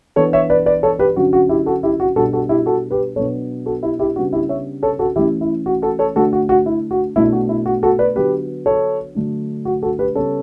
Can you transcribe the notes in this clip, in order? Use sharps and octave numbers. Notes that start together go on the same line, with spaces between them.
E3 B3 D4 A4 C#5
C#5 E5
B4 D5
B4 D5
A4 C#5
G4 B4
D3 F#3 C#4 F#4
F#4
E4 G4
F#4 A4
E4 G4
F#4
B2 G3 D4 F#4 A4
F#4 A4
E4 G4
F#4 A4
G4 B4
B2 F#3 B3 D4 A4 C#5
F#4 A4
E4 G4
E4 G4
C#3 G3 B3 D4 F#4
E4 G4
C#5 E5
A4 C#5
F#4 A4
E3 A3 C#4 E4 G4
E4
F#4
F#4 A4
A4 C#5
D3 A3 D4 F#4 A4
F#4
F#4
E4
F#4
B2 A3 D4 E4
F#4
E4
F#4
F#4 A4
B4 D5
D3 F#3 B3 G4 B4
A4 C#5
D3 F#3 A3 D4
F#4
F#4 A4
G4 B4
C#3 G3 B3 A4 C#5